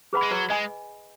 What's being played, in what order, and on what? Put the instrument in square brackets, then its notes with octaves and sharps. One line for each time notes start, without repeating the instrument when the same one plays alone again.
[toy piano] G#4 B4 F#5 B5
[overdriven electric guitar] G#3
[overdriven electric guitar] F#3 [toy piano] B4
[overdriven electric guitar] G#3 [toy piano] D#5 G#5